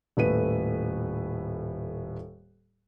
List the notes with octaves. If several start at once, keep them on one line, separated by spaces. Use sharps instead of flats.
D#1 A2 B4 D#7